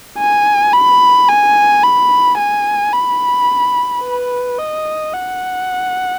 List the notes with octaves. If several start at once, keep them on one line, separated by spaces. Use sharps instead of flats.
G#5
B5
G#5
B5
G#5
B5
B4
D#5
F#5